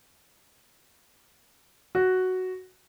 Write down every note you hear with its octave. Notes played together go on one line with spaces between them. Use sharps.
F#4